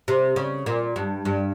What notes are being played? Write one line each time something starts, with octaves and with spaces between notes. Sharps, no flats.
C3
C#3
A#2
G2
G2